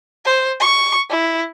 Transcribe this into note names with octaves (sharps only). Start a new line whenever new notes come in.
C5
C#6
E4